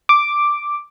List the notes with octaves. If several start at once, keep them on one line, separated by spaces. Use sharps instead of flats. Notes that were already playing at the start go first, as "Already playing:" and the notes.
D6